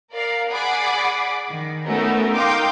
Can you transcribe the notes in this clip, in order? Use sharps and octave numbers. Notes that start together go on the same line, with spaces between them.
A#4 D5 F5
G#4 D5 F#5 B5 D6
D#3
A3 B3 C#4 D#4 F#4 A#4
D#4 A#4 F5 G5 C6 D6